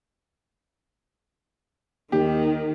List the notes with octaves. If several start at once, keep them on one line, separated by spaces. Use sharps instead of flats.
D#2 D#3 G4